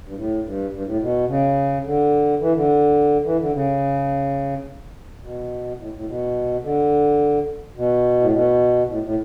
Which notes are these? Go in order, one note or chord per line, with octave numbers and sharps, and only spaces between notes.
G2
A2
G2
G2
A2
B2
C#3
D3
E3
D3
E3
D3
C#3
B2
A2
A2
B2
D3
B2
A2
B2
A2
A2